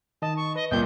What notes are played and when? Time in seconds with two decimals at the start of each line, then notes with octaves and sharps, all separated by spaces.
0.22 D#3 D#5 A5
0.37 C#6
0.56 B4 D#5
0.71 C2 A#2 D#5 G5 G6